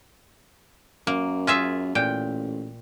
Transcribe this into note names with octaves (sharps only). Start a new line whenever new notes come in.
F#2 A#3
F4 G#4 E5
A1 A#2 G5